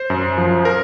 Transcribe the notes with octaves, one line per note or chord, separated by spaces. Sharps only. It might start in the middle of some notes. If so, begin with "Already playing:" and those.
Already playing: C5
F#2
F3
A#4